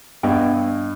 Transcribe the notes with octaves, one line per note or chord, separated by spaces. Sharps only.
G2 B3 D#5 G5